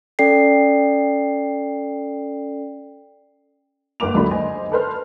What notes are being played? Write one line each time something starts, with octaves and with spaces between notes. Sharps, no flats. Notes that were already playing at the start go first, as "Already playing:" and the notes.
C#4 A4 D5 G5 C7
G1 G2 A#3 D6 F7
C#2 D3 F#3 B5
C5 D#5 G#5
A4 B4 C5 F6